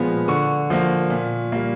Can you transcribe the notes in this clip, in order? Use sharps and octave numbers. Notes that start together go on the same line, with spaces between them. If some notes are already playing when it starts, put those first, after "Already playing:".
Already playing: A#2 F3 G#3 B3
D3 C#6
F3 A#3
A#2
G3 A#3